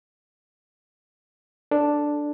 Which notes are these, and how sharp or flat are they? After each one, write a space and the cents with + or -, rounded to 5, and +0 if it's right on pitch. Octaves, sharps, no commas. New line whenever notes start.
D4 +0 A4 +0